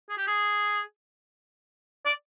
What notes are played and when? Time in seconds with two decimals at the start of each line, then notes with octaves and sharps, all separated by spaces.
0.10 G#4
0.18 G4
0.27 G#4
2.06 D5